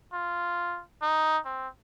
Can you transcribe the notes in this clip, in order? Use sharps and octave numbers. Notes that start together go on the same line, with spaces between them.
F4
D#4
C4